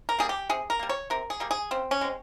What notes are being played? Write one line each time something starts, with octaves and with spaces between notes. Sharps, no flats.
A#4
G3 A#3 G#4
G4
C3 G#4
A#4
G3 A#3
C#5
C3 A#4
G#4
G3 A#3
G#4
C#3 C4
C#4
G#3 C4